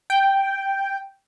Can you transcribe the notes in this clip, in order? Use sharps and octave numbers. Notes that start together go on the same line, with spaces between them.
G5